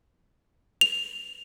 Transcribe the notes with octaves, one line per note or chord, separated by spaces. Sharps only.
F7